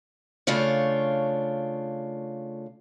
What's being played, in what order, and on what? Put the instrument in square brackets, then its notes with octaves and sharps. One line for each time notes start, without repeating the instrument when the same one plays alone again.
[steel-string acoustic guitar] C#3 A3 D4 F4 C#5